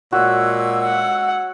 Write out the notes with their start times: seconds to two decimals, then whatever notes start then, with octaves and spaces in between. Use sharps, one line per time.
0.12 A#2 G#3 F#4 C#5 E6
0.84 F#5